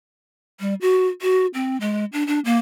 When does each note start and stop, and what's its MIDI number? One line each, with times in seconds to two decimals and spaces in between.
0.60 0.74 55
0.81 1.07 66
1.22 1.47 66
1.54 1.77 60
1.81 2.05 56
2.13 2.26 62
2.27 2.40 62
2.45 2.58 58